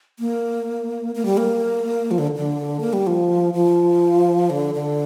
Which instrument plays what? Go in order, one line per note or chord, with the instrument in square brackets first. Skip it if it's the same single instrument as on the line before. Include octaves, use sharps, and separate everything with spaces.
[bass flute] A#3
A#3
G3
A#3
F3
D3
D3
A#3
G3
F3
F3
D3
D3